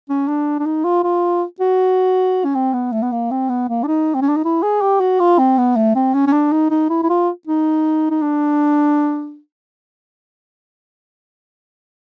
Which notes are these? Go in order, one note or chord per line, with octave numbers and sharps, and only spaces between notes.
C#4
D4
D4
D#4
F4
F4
F#4
C#4
C4
B3
A3
B3
A#3
C4
B3
A#3
D4
D#4
C4
C#4
D4
D#4
E4
G#4
G4
F#4
F4
C4
B3
A3
C4
C#4
C#4
D4
D#4
D#4
E4
E4
F4
D#4
D#4
D4